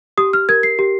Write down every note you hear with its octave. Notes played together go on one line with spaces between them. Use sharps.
G4 D#6
F6
A#4 G#6
C7
G4